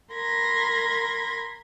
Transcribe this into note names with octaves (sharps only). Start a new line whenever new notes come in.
A#4 B5 C6 G#6 A#6